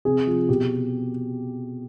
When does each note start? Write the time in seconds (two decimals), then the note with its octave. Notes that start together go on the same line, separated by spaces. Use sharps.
0.05 C3 G#4
0.27 F3
0.49 B2 G4